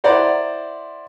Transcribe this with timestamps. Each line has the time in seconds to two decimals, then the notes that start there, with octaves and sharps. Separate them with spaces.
0.04 E4 C5 D5 F#5 A#5